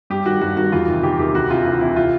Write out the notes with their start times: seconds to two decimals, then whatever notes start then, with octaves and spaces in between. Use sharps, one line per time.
0.10 G2 G4
0.26 D#3 F#4
0.41 G2 F#4
0.57 D#3 F#4
0.72 E2 F4
0.88 C3 D#3
1.03 E2 G4
1.19 C3 D#3 G4
1.34 D2 F#4
1.50 C3 E3 F4
1.65 D2 F4
1.81 C3 E3 E4
1.96 F4